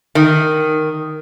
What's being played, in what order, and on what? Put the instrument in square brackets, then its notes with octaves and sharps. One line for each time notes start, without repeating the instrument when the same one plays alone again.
[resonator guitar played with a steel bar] D#3